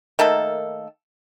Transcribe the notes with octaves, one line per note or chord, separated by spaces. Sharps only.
D#3 A3 A#3 A4